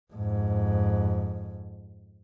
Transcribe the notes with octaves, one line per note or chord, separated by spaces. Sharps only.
F2 G#2